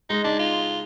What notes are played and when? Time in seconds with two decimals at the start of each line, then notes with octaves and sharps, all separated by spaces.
0.09 G#3 D#4
0.24 D4 D#4
0.39 F4